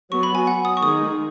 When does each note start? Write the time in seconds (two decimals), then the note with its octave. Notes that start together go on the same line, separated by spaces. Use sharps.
0.12 F#3 B3 F#4 C#6
0.23 B5
0.35 G#5
0.47 F#5
0.65 D#6
0.77 C#6
0.83 D#3 G#3 D#4 G#4 D#6